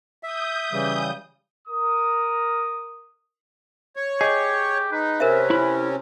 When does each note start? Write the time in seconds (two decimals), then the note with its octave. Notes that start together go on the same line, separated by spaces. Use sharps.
0.23 E5 D#6 G6
0.72 C#3 E3 G3
1.67 A#4 D#6
3.96 C#5
4.21 G4 G#4 D#5
4.92 D#4 B4
5.20 C3 C#4 A#4 C5 E5
5.50 E4 B5